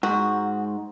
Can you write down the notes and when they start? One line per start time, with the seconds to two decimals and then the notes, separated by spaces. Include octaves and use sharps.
0.03 G#2 F#4